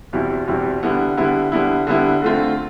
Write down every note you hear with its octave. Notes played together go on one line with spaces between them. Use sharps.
E2 B2 G3 C4 E4
E2 B2 G3 C4 E4
D3 G3 B3 E4
D3 G3 B3 E4
D3 G3 B3 E4
D3 G3 B3 E4
D3 A3 C4 F4